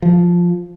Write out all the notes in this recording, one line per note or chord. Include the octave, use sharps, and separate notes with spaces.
F3